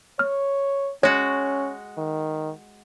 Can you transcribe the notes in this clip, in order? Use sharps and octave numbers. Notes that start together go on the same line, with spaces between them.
C#5 F6
G#3 C#4 F#4 C#5
D#3